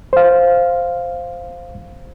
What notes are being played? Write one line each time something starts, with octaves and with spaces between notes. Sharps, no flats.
C5 F5